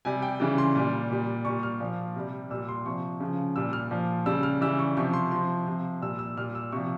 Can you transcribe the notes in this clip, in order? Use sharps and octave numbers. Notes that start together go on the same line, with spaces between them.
C3 G3 G#5
G5
C#3 E3 G3
C6
A#2 G3
A#2 G3
A#2 G3 C#6
F6
A#2 F3
C3 G3
A#2 G3 E6
C6
C3 F3 C#6
C#3 F3
A#2 G3 E6
F6
A#2 F3
C#3 G3 E6
F6
C#3 E3 G3 E6
C#6
C3 F3 C#6
C6
C3 F3 C6
C3 F3
A#2 G3 E6
E6
A#2 G3 F6
E6
C3 F3 C#6